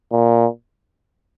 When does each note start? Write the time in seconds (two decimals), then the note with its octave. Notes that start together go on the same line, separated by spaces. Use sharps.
0.12 A#2